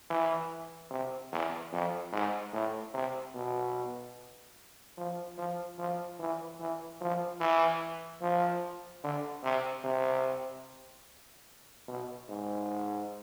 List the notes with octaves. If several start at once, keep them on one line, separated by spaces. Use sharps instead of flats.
E3
C3
E2
F2
G#2
A2
C3
B2
F3
F3
F3
E3
E3
F3
E3
F3
D3
C3
C3
B2
G#2